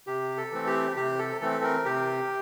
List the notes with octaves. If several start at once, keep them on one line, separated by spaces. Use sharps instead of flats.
C3 G4
A4
E3 A3 C4
G4
C3 G4
A4
E3 A3 C4 A4
A#4
C3 G4